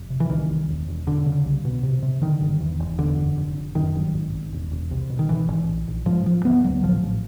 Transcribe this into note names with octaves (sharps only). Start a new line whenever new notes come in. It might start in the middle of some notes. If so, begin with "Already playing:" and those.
Already playing: F1
C3
E3
C2 D#3
C2
E1
E1
E1 D3
C#3
C2
B2
C3
C3
D3 D#3
G1
E2
F1
E2 D3
F#1
F1
F1
F#2 D#3
G1
G#1
G#1
E1
E1
C2
B2
D#3
G#1 E3
G#1
A#1
A#1
G#2 F3
G#2 F3
D2 B3
D2 F#3
A1 F3
A1